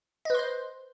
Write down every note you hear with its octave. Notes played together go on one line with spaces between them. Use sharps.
B4 C5 D#5 C6